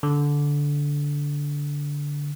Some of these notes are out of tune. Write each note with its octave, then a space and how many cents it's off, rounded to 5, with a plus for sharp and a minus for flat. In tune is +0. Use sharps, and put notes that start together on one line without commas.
D3 -15